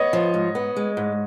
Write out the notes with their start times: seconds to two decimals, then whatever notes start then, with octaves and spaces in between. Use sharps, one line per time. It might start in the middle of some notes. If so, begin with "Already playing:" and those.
Already playing: B3 C#5 D#5
0.13 F3
0.34 G#2
0.55 B3
0.76 G#3
0.97 G#2